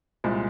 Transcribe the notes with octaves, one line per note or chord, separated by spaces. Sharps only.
C2 A#2 G#3